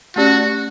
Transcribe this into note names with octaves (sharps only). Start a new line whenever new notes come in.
A3 C#4 F#4 G4 D5